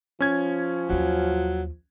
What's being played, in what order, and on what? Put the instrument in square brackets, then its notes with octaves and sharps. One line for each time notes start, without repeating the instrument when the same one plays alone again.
[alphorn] F3 [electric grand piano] C#4 G#6
[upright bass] D#2 F4 [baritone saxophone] F#3